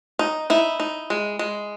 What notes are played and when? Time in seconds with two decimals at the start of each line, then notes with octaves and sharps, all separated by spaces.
0.19 D#4
0.50 D#4 E4
0.80 D#4
1.10 G#3
1.39 G#3